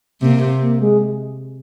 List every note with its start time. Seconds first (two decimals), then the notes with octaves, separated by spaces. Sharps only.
0.22 C3 A#3
0.61 A#3
0.80 G#3